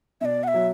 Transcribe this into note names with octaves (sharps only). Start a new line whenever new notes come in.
B2 D5 E5
F#5
E5
F#3